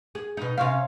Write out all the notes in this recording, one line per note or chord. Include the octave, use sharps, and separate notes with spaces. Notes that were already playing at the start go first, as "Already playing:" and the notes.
G#4
B2 D#4
C3 C#4 F5